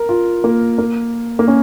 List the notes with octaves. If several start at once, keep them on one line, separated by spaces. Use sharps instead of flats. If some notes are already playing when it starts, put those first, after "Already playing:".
Already playing: A#4
F4
A#3
A#3
A#3
C#4